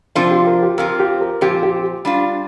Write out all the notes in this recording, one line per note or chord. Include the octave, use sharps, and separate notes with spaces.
C3 F3 C4 D4 F4 C5
G4
A#4
G4
F2 F3 C4 A#4
G4
A#4
A#2 F3 C4 G4
G4
G3 D4 F4